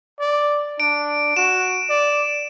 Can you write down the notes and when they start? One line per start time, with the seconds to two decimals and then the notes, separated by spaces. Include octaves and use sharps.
0.20 D5
0.80 D4 D7
1.37 F#4 E7
1.89 D5